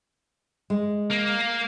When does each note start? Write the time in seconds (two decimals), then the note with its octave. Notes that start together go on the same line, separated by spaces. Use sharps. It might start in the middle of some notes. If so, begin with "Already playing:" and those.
0.70 G#3
1.10 A#3